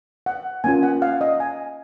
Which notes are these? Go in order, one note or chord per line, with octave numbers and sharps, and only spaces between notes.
F#5
A#3 C#4 F4 G#5
F#5
F5
D#5
G#5